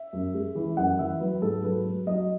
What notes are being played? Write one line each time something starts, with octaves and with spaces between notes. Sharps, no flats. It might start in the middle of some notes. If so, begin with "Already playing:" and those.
Already playing: E5
F#2
G#3
E3
F#2 F#5
E3 E5
F#3 B4
G#2 A4
F#3 B4
F#3
F#3 D#5